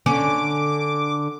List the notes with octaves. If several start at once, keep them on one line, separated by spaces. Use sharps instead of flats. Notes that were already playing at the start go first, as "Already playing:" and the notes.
D3 C#4 D6